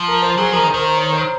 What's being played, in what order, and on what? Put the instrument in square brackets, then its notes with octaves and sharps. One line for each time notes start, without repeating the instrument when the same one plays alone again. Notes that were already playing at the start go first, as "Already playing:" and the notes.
Already playing: [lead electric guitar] F3
[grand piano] A#4
C5
[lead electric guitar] F#3 [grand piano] G#4
[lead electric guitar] F3 [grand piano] A#4
[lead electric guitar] D#3
[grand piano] C5
[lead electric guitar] D#3 [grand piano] A#4
[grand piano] C5
C#5
C5